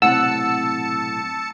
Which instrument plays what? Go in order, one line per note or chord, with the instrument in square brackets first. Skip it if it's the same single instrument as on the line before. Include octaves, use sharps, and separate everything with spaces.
[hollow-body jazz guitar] B1 A2 C3 [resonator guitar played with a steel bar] F#5 [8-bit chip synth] A5 C#7 [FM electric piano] E6